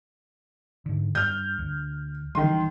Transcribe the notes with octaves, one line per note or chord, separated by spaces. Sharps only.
G#2 D3
G2 F6 G6
D2
A#1 D#3 E3 G3 C6